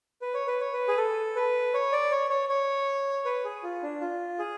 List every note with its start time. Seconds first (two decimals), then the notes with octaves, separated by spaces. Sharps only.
0.22 B4
0.34 C#5
0.47 B4
0.60 C#5
0.73 B4
0.88 G#4
0.97 A4
1.36 B4
1.74 C#5
1.92 D5
2.12 C#5
2.30 C#5
2.49 C#5
3.25 B4
3.45 G#4
3.63 F4
3.83 D4
4.01 F4
4.39 G#4